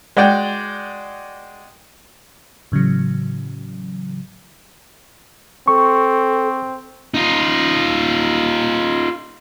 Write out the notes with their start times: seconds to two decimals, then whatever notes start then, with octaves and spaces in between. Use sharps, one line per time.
0.17 G#3 F#4 D5 G5
2.72 A2 C#3 E3 F#3
5.68 C4 A4 C#6
7.14 D#4 F4